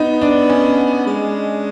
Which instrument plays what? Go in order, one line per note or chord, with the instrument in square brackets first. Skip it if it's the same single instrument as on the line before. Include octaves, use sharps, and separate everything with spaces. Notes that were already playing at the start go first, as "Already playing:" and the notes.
Already playing: [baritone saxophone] B3 [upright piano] D#4
[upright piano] D4
C#4
[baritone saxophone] G#3